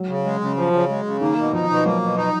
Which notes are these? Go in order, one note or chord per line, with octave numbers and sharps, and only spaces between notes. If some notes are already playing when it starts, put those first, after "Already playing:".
Already playing: F#3
C#3
G#3
C#3
F3
C#3
G#3
C#3
D#3 A#3
B2
F3 D#4
B2
F#3 A#3
B2
D#4